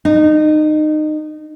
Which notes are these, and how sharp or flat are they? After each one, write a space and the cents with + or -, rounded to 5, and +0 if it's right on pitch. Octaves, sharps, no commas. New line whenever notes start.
D#4 -25